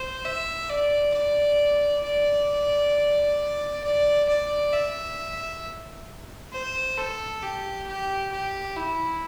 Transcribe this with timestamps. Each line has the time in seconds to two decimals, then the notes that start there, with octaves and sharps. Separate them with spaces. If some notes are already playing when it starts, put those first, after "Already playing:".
Already playing: C5
0.25 E5
0.70 D5
1.14 D5
2.04 D5
3.84 D5
4.28 D5
4.73 E5
6.53 C5
6.98 A4
7.43 G4
7.87 G4
8.32 G4
8.76 E4